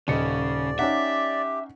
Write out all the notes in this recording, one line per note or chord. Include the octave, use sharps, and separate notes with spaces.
D#1 C#3 D5 D#5 C#7
C#4 D#4 G4 E5 F#5